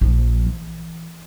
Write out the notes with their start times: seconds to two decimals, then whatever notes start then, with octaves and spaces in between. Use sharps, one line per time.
0.01 A#1 F3
0.46 E3